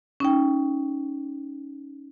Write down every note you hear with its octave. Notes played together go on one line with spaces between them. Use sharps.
C#4 D#4 G5